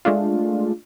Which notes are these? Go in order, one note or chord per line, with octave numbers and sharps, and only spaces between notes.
G#3 A3 D4 F4